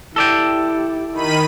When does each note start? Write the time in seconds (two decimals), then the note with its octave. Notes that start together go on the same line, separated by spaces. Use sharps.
0.16 E4 G4 A4 D5 G5
1.13 D#3 B5 D#7